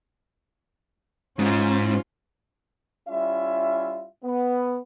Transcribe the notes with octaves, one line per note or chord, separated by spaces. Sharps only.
G#2 C#4 F4
G3 C#4 E4 F4 E5
B3